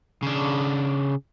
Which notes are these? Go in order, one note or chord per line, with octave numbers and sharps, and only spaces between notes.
C#3 D4